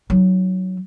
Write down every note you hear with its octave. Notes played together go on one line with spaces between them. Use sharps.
F#3 D#4